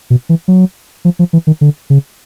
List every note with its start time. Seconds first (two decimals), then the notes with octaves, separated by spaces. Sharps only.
0.10 B2
0.29 E3
0.48 F#3
1.05 F3
1.19 F3
1.33 E3
1.47 D#3
1.61 D3
1.90 C#3